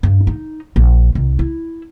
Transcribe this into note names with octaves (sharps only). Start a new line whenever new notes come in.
G2
D#4
A#1
C2
E4